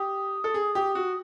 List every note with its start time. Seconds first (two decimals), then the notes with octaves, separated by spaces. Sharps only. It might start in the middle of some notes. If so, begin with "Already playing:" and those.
Already playing: G4 D#6
0.44 A4
0.54 G#4
0.75 G4
0.95 F#4